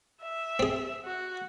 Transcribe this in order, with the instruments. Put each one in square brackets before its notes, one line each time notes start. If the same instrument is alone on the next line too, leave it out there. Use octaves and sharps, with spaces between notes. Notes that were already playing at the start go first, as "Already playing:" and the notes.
[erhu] E5
[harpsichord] C4 G#4
[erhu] F#4